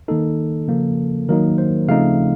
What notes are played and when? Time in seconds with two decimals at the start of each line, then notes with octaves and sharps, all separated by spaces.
0.08 D#3 A#3 D#4 A4
0.68 C#3 F3 A#3
1.29 D#3 F#3 A#3 D#4 A#4
1.58 C5
1.88 C#3 F3 A3 C4 D#4 F5